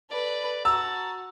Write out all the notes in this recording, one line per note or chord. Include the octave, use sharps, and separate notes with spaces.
A4 B4 D5
F#4 A5 A#5 E6